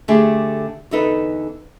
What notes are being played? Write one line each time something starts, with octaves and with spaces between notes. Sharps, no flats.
D3 A3 G4 G#4
E2 D3 D#4 A4 B4